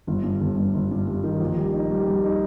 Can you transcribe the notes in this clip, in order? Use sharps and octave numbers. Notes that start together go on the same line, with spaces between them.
G1
G2
G1
G2
G1
G2
G2
D#3
A#1
G3
D#4
G3
G3
D#4